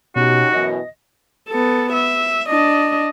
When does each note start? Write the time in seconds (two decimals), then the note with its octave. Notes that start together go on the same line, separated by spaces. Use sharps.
0.16 B2 C#4 D#4 F#4 G4
0.53 F#2 B2 E3 D#5 A#6
1.49 B3 A4
1.93 E5
2.49 D4 D#5